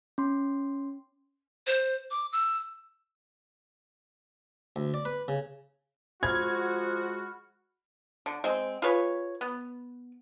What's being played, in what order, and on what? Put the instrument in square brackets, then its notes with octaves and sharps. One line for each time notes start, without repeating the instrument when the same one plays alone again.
[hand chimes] C#4 C6
[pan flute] C5
D6
E6
[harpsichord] D2
D5
B4
C#3
[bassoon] F3 [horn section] G#3 F#4 [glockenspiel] B5 F6 [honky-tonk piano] G#6
[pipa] D3
G#3 C4
F4 G#4 B4 C#5
B3